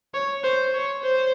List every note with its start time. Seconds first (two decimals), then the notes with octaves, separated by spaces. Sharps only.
0.14 C#5
0.44 C5
0.74 C#5
1.03 C5